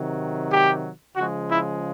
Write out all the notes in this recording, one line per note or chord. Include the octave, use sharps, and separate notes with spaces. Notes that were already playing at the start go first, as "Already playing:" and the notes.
Already playing: C3 D#3 F#3
G4
C#3 F3 G#3 F#4
E4